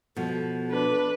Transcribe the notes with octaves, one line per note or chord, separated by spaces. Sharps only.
B2 F3 A4
D4 B4